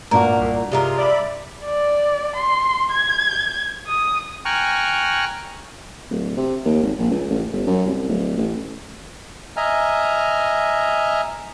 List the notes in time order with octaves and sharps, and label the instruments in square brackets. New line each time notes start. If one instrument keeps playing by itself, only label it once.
[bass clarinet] G2 [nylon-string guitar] A#2 D4 F#4 [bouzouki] A#4
[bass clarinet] C2
[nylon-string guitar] G2 [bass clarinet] C3 [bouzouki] G#3 F4 A#4
[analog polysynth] D5 E5 B5
[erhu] D5
C6
G#6
D#6
[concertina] G5 G#5 A#5 C#6 F6 F#6
[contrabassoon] D1
C3
D#2
G#1
A#1
C#2
A1
G1
F#2
C2
D1
A1
[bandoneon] D#5 E5 G#5 A#5 F6